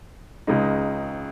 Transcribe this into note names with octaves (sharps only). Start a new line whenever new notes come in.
C#2 C#3 G#3 D#4